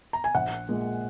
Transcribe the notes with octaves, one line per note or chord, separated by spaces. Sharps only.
A#5
G#5
A#1 F#5
A#2 G#3